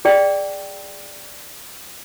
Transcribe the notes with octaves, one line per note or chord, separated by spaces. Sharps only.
G#4 D5 G5